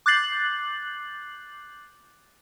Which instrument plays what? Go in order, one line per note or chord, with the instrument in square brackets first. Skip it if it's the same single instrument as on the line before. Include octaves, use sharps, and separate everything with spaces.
[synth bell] D6 F#6 G6 A6 C7 F#7